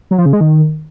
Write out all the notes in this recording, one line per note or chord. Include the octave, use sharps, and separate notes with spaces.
F#3
F3
C#3
G#3
D#3